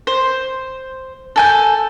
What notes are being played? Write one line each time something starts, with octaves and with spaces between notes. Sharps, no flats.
C5
A4 G#5 G6